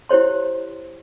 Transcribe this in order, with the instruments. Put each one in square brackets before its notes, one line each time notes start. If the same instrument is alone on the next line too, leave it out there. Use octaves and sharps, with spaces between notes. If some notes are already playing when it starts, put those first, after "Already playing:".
[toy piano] E4 G4 C5 C#5 C6